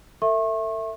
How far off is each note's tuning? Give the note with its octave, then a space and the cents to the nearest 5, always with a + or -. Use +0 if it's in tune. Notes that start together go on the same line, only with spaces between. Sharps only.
A4 +40 E5 +0 C#6 -35